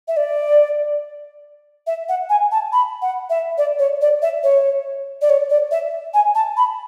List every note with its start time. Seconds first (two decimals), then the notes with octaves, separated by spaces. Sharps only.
0.08 E5
0.17 D5
1.87 E5
2.09 F#5
2.29 G#5
2.52 A5
2.72 B5
3.02 F#5
3.30 E5
3.58 D5
3.79 C#5
4.01 D5
4.22 E5
4.43 C#5
5.21 D5
5.29 C#5
5.50 D5
5.71 E5
6.14 G#5
6.35 A5
6.57 B5